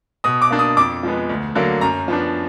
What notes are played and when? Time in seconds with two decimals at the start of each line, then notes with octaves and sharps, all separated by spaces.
0.24 B2 D#6
0.42 D6
0.51 A#3 D4
0.59 D#6
0.77 F2 D6
1.03 F3 G#3 B3
1.29 D2
1.55 D3 F#3 A#3
1.81 F#2 A#5
2.08 F3 B3 D4